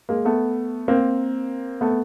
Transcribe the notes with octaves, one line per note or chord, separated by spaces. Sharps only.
G#3 A#3
A3 B3
A#3 C4
A3 B3